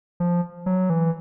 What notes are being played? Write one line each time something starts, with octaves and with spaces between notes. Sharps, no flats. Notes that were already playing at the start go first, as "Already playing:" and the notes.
F3
F#3
E3